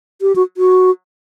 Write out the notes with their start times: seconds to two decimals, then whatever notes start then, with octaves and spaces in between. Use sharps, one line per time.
0.22 G4
0.36 F#4
0.57 F#4